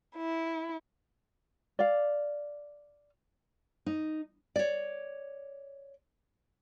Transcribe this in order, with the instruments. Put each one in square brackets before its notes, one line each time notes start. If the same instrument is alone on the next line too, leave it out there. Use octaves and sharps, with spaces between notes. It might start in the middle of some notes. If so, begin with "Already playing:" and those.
[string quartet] E4
[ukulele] D5 F5
[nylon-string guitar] D#4
C#5 D5